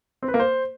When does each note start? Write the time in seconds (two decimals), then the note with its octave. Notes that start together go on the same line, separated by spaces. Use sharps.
0.23 C4
0.28 B4
0.34 A#3
0.40 C5